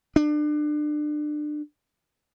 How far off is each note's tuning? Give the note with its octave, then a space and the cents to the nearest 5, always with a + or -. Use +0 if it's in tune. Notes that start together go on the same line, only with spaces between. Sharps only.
D4 +30